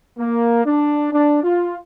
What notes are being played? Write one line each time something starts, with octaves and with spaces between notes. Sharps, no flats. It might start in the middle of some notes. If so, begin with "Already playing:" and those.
A#3
D4
D4
F4